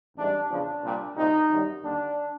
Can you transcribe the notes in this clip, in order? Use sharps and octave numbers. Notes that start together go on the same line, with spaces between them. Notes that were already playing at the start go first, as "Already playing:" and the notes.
A1 G#2 E3 G3 D4
E2 C#3 F3 D4
C2 A#2 G3
C2 A#2 G3 D#4
G#1 F#2 D#3 G3
D#2 D3 G3 D4